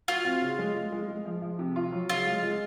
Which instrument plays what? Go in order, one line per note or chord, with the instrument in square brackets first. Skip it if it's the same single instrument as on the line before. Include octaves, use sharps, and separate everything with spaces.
[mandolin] F4 [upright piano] F#4
[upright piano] C4
C#3
G#3
G#3
G#3
G#3
F3
F3
C3
F4
F#3
[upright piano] C#3 [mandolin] F4
[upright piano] G#3
G#3